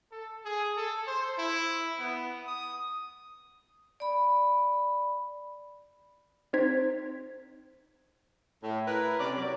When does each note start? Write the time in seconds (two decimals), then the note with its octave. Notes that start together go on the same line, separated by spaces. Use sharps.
0.12 A4
0.45 G#4
0.77 A4
1.07 C5
1.39 E4
1.99 B3
2.47 D#6
4.00 D5 B5
6.53 C4 D#4 C5 G#6 B6
8.63 A2
8.87 E4 A#4 B4
9.19 C3 C#4 D5
9.37 F#3 D5